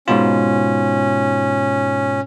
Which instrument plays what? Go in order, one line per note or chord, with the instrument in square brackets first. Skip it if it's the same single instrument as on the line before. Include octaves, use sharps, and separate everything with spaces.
[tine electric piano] G#2 B2 F4 [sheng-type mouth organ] C#4